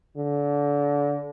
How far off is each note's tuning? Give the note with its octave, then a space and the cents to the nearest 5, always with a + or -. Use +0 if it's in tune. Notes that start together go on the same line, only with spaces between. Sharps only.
D3 -30